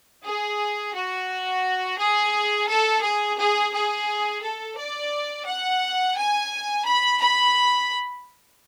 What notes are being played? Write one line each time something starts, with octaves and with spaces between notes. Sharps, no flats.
G#4
F#4
G#4
A4
G#4
G#4
G#4
A4
D5
F#5
G#5
B5
B5